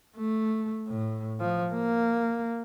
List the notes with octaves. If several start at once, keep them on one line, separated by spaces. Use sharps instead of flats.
A3
A2
F3
A#3